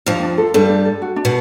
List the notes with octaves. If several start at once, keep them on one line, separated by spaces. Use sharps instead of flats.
F2 F3 D4
D4
A4
G2 G3 A4
D4
A4
F#4
D4
B2 B3